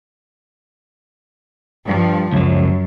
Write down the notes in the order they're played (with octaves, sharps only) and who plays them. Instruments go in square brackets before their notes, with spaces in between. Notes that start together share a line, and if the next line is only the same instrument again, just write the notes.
[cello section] G2 F3
[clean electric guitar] C#2 F3 [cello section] F#2